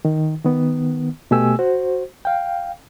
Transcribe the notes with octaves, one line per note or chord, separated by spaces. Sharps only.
D#3
D#3 B3
B2 A3 G4 G#5 E6
F#4 C5
F5 G5